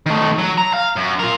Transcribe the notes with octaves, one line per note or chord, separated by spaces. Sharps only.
D#3 A3
F#3
A#5
F5
F#2
F4 A#4